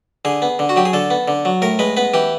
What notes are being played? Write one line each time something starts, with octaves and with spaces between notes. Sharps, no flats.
D3 G#4
B3
D3
F#4
F#3 G4
G#4
D3 A4
B3
D3
F#3
A2 A#4
G#3 B4
B3 B4
E3 G4